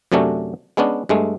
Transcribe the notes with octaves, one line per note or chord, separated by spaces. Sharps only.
F#2 C3 F#3 A3 C#4 D4
G#3 B3 C#4 D4
G2 G#3 A3